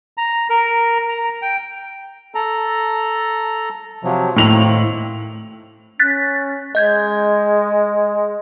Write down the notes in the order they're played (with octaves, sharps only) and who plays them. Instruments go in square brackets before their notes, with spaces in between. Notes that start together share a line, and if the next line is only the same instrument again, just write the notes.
[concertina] A#5
A#4
A#5
G5
[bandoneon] A4 A#5
C3 F3 F#3
[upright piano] A2 F7 F#7 [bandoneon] D#3 A#3 C4
[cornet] C#4 [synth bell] F#6 A6 B6
[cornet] G#3 [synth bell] D#5 G6 G#6